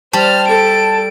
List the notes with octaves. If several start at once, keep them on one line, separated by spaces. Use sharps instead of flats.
G3 C5 A5 F6
A4 D7